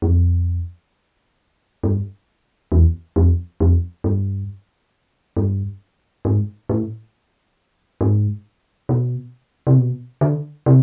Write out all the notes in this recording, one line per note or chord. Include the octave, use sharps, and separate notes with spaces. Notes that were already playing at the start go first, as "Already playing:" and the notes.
F#2
F2
G2
E2
F2
F2
G2
G2
G#2
A2
G#2
B2
C3
B2
D3
C3